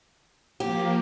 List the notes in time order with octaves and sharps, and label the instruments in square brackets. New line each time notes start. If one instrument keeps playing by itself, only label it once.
[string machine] F3 A#3 [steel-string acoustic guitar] G4